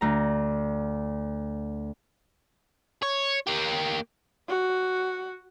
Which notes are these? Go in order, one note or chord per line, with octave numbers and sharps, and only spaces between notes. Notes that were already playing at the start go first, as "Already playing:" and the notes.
D2 A#5
C#5
A#3 G4
F#4